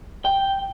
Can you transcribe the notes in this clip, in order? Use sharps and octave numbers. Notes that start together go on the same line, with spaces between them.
G5